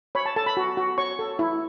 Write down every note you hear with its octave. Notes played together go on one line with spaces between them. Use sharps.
C#5 B5
A5
A4 A5
B5
F#4
F#4
C#5 C#6
A4
E4